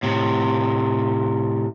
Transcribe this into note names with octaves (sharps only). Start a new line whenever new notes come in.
A2 C3